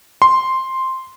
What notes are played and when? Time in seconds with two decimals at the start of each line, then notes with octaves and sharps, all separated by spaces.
0.22 C6